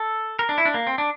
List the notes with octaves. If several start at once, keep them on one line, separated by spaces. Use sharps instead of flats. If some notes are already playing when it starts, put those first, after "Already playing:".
Already playing: A4
A#4
D4
E4
D4
A#3
C4
D4